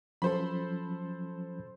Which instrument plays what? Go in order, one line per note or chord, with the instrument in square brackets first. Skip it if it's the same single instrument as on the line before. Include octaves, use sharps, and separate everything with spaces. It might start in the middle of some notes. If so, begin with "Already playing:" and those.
[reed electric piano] F3 F#3 C#4 [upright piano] A4 C5 B5